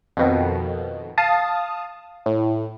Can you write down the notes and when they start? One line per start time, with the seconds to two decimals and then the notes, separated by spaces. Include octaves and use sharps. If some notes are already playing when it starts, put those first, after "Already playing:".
0.17 F2 B2 D#3
1.18 F5 A5 D#6
2.26 A2